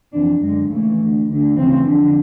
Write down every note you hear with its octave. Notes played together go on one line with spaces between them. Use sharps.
F2 C3 E3 D4
F#2 D3 G#3
D#2 C#3 E3 A3
D2 D3
D2 D3
D2 C#3 E3 C4
F2 D3